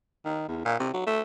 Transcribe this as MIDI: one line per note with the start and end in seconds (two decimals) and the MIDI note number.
0.25 0.46 51
0.48 0.60 40
0.65 0.76 46
0.80 0.90 48
0.94 1.06 54
1.06 1.21 57